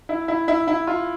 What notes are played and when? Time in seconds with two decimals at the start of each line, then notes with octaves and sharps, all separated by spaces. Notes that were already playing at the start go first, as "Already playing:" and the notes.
0.09 E4
0.28 E4
0.48 E4
0.68 E4
0.87 F4